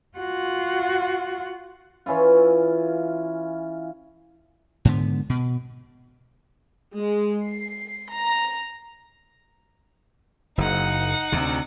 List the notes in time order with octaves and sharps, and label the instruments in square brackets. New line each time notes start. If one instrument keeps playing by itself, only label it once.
[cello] F4 F#4
[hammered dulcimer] E3 C#4 E4 F4
[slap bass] G#2 D3 B3
B2
[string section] G#3
C7
A#5
[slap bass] F#1 [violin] D#4 F#5
[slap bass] D2 C3